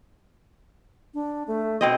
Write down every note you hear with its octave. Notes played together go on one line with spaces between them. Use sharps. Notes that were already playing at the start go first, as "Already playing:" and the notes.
D4
A3
B2 C4 D#5